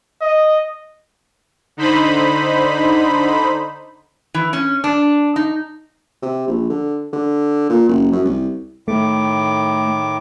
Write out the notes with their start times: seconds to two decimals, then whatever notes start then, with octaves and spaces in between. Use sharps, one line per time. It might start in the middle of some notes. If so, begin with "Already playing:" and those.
0.21 D#5
1.77 D3 D#4 C5 B5
4.34 E3
4.53 C#4
4.84 D4
5.36 D#4
6.23 C3
6.48 A#1
6.70 D3
7.13 D3
7.70 A#2
7.89 F#1
8.12 F#2
8.25 C2
8.88 A2 D#3 A3 D6